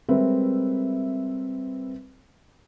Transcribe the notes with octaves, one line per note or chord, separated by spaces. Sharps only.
G3 G#3 C4 A#4 B4 E5